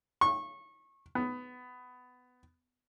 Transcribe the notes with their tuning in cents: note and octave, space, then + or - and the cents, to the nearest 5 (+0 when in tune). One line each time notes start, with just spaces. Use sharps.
C#6 -25
B3 +15